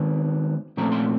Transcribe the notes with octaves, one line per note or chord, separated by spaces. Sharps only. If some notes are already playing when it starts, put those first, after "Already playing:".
Already playing: D#3 G#3 B3
A#2 F3 A3 C4 A#5
C6